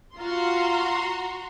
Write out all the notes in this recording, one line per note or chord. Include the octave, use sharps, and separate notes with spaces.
F4 F#4 F5 A#5 C6